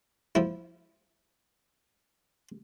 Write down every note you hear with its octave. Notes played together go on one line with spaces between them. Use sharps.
F3 E4